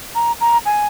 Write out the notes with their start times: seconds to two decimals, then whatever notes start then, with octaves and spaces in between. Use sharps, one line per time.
0.15 A#5
0.41 A#5
0.66 G#5